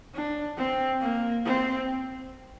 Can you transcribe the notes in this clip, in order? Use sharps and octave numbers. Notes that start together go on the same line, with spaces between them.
D4
C4
A#3
C4